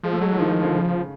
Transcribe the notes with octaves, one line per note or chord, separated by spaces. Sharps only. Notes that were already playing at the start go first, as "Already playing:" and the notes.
F3 G#3
A3
F#3 G#3
E3
D#3 F3
D#3
D3
C#3